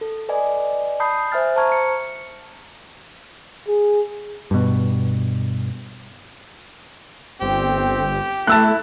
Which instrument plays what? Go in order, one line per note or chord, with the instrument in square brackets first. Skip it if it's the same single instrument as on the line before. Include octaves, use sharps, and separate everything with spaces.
[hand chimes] A4
B4 D5 D#5 G#5
A5 B5 D#6 G6 C7
C5 E5 G#5 F6 A6
C5 A5 A#5 C#6 F6 G#6
C#7
[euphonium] G#4
[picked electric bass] G2 B2
[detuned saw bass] G1 [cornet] C4 [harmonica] G4
[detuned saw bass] A3 [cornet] E4 [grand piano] A5 E6 F#6